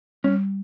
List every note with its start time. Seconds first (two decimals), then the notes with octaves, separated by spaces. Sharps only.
0.24 G3 C#4